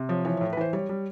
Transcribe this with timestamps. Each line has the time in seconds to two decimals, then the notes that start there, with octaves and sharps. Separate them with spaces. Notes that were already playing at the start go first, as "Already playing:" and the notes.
Already playing: C3
0.09 F3 C#5
0.25 E3 C#5
0.37 C#5
0.41 A2
0.53 B4
0.57 E3 C5
0.73 G3 C#5
0.89 G3